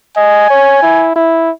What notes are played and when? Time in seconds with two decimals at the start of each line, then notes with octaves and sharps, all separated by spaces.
0.16 D#5 G#5
0.50 C#5
0.83 E4
1.16 E4